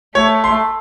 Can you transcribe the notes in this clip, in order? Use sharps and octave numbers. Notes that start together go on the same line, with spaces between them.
A3 C#5
C6